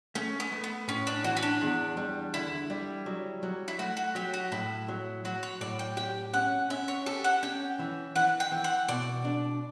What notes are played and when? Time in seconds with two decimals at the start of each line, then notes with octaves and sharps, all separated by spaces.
0.15 A3 C#4
0.40 B3
0.52 A3
0.64 B3
0.88 A2 C#4
1.07 D4
1.24 E3 F#4
1.37 C#4
1.42 D4
1.62 E2
1.97 G3
2.33 D3 E4
2.70 G3
3.06 F#3
3.43 F#3
3.68 E4
3.79 A3 F#4
3.97 F#4
4.15 F#3 G4
4.34 F#4
4.52 A2 E4
4.88 F#3
5.25 F#3 F#4
5.43 C#5
5.61 A2 D5
5.79 G5
5.97 G4 G5
6.34 C#4 F#5
6.70 C#4 E5
6.88 C#5
7.06 G4 A4
7.24 F#5
7.43 C#4 G5
7.80 E3
8.16 E3 F#5
8.40 G5
8.52 E3
8.64 F#5
8.88 B2 D5
9.25 D4